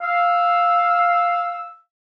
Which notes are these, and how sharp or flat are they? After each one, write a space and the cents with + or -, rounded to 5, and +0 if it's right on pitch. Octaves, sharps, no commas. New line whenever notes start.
F5 +0 E6 +0